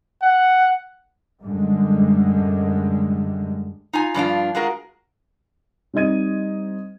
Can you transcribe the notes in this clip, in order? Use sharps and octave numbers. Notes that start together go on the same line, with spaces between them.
F#5
F#2 D3 G3 G#3
D#4 F4 G#5
G2 F3 D4 F4
G#3 F4 F#4 G#4 A#4
G3 C4 D#4 D#5 G#6 D#7